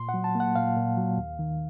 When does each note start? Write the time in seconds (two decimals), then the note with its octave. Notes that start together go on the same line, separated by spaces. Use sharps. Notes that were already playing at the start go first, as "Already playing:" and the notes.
Already playing: A#2 C6
0.09 F#5
0.14 F#3
0.24 A5
0.35 A#3
0.40 F#5
0.56 A#2 F5
0.77 A#2
0.97 F#3
1.18 D#2
1.39 D#3